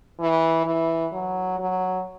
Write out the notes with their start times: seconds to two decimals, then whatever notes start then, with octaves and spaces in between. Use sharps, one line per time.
0.20 E3
0.66 E3
1.13 F#3
1.59 F#3